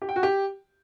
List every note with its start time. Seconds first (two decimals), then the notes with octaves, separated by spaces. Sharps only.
0.02 G4
0.09 G5
0.16 F#4
0.23 G4